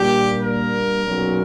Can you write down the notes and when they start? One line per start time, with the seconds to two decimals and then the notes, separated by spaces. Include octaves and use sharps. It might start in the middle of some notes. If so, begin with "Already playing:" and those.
Already playing: A#2 G3 A#3 D4 G4
0.41 A#4
1.05 B1 A#2 F#3 C#4